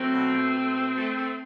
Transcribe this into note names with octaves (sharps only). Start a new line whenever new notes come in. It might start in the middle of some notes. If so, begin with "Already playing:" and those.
Already playing: F#3 A3 C4
B2
B2
B2
A3
A3
A3